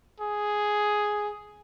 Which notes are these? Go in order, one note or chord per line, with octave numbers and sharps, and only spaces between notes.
G#4